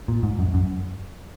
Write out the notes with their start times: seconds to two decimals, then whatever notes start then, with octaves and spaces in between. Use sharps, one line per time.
0.08 A#2
0.23 G#2
0.39 F#2
0.54 F#2